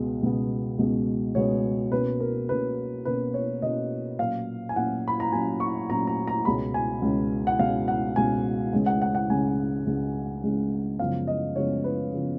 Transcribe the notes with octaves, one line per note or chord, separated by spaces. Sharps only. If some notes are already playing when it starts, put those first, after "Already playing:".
Already playing: C#2 B2 G#3 B3
C#2 B2 G#3 B3
C#2 B2 G#3 B3
C#2 B2 G#3 B3 C#5
B2 A#3 C#4 B4
A#4
B2 A#3 C#4 B4
B2 A#3 C#4 B4
C#5
B2 A#3 C#4 D#5
A#2 F#3 C#4 F5
G#5
A#2 F#3 C#4 F#5
B5
A#5
A#2 F#3 C#4 G#5
C#6
A#2 F#3 C#4 A#5
A#5
A#5
C#2 B2 G#3 C#4 B5
G#5
C#2 B2 G#3 C#4
F#5
C#2 B2 G#3 C#4 F5
F#5
C#2 B2 G#3 C#4 G#5
C#2 C#3 G#3 C#4
F#5
F#5
F#5
C#2 C#3 G#3 C#4 G#5
C#2 C#3 G#3 C#4
C#2 C#3 G#3 C#4
F#2 C#3 F3 G#3 B3 F5
D#5
F#2 C#3 F3 G#3 B3 C#5
B4
C#3 F3 G#3 B3